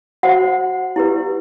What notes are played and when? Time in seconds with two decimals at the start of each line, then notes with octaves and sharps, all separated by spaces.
0.23 F#4 C5 F#5
0.96 E4 G4 B4